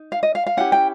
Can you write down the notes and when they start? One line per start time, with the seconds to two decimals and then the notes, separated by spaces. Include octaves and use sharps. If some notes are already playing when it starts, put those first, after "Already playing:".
Already playing: D#4
0.12 F5
0.23 D#5
0.35 F5
0.47 F5
0.57 C#4 E4 G4 F#5
0.72 G5